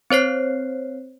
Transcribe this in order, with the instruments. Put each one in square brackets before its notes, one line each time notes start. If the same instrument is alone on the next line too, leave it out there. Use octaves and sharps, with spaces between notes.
[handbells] C4 C5 C#5 C7